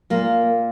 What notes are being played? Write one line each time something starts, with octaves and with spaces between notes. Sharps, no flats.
A#2 A#3